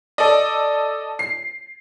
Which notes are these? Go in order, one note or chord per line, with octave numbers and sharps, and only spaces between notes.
A4 D5 D#5
C7